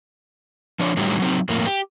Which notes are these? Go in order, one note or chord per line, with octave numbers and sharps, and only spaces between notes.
F3 D4 C#5
A2 D3 D#3 F#3 G3
F#3 C4 D#4
F2 A2 A#3
G4